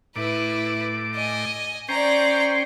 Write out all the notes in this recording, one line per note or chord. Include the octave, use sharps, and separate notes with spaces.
A2 E4 B4 D6
D#5 G#5
C#4 C5 D5 G5 A#5